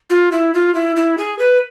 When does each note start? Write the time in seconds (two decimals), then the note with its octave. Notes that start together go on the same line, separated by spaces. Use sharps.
0.10 F4
0.32 E4
0.54 F4
0.75 E4
0.96 E4
1.18 G#4
1.39 B4